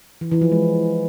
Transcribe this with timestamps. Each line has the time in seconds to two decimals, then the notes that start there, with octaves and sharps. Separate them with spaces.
0.21 E3
0.31 E3
0.41 F3
0.52 G#3